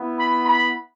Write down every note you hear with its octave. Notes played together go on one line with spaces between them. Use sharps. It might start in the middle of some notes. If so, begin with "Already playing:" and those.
Already playing: B3 E4
B5
B5